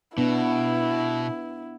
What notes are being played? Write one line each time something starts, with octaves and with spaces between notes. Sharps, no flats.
B2 B3 D4 E4